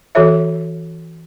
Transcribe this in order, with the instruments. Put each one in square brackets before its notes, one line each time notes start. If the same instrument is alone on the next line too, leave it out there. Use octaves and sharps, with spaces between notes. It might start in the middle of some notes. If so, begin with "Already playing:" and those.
[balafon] E3 F#4 A4 C#5 E5